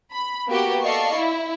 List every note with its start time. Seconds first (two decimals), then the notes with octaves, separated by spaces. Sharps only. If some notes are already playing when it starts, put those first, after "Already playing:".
0.12 B5
0.48 A#3 B3 F#4 G4
0.82 A4 D5 D#5 F5 C#6 C7
1.15 E4